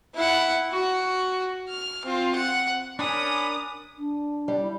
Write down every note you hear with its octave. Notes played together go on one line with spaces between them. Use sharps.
E4 F#5
F#4
F6
C4 F4
F#5
C#4 D4 A#4 B5 D6 D#6
D4
G3
E4